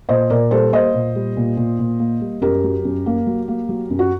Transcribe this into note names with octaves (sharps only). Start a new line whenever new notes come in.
A#2 C5 D#5
A#2 A#4 D5
G3 A4 C5
A#3 C5 D#5
A#2
G3
A#2
A#2
A#2
A#3
G3
F#2 G4 A#4
F#3
F#2
A#3
F#3
A#3
F#3
F#2
F#4